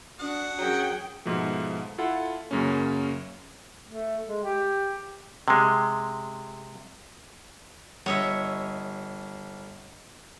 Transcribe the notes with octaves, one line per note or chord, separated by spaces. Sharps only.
D4 F#4 F#5 D#6
F#2 F#3 G#4 G5
G#2 B2 F3 A3
E4 F4 A4 F#5
F#2 C#3 A#3 C#4
A3
G#3
G4
C3 G#3
G1 C#5 D#5 E5